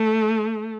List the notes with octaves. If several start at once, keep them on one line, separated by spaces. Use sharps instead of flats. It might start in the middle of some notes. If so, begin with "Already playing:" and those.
Already playing: A3